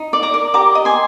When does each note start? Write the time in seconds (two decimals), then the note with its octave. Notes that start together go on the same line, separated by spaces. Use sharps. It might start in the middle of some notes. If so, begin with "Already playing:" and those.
Already playing: D#4
0.13 D5
0.23 A#5 D6
0.34 A#4
0.54 G4 A#5 D6
0.75 D#5
0.85 G#5 C6